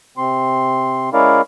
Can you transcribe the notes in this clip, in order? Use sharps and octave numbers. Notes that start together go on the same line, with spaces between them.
C3 C4 C6
G#3 C#4 E4 A#4 D5 F5